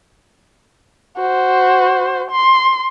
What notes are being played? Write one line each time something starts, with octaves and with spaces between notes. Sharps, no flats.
F#4 C5
C6